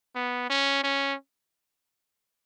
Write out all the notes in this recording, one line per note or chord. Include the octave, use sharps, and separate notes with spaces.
B3
C#4
C#4